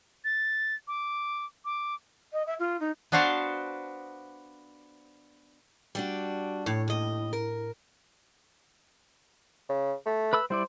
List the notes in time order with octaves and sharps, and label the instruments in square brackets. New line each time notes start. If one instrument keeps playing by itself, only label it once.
[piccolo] A6
D6
D6
[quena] D#5
E5
F4
D#4
[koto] B3 D4 F#4 C5 F5 A5
[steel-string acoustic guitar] G3 D4 F#4
[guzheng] A2 [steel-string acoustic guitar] C#5
[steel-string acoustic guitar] D#2 D#5
A#4
[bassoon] C#3
A3
[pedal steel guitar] B4 B5 E6
[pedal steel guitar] G3 E4 D5 [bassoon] C5